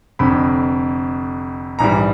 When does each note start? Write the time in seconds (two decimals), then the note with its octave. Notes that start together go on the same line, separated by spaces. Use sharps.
0.19 F1 F2 D3 B5
1.79 A#1 G#2 E3 G3 A#5